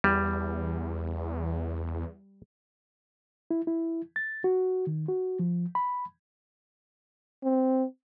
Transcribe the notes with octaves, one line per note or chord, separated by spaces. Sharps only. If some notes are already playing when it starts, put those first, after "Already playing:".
E2 G3
E4
E4
A6
F#4
D#3
F#4
F3
B5
C4